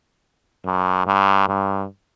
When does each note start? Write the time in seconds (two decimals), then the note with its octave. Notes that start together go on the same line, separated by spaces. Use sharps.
0.65 F#2
1.06 G2
1.48 G2